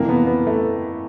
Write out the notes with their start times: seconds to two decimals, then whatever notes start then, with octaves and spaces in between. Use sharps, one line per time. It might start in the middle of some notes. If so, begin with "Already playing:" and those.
Already playing: F2 C3 E3 A#3
0.09 B3
0.27 B3
0.47 A3